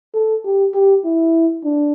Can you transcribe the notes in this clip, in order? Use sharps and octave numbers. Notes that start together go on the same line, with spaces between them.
A4
G4
G4
E4
D4